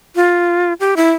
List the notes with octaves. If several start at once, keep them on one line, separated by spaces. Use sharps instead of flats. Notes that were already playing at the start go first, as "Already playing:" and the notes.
F4
G4
E4